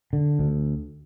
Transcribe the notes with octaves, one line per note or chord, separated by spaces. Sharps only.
D3
D2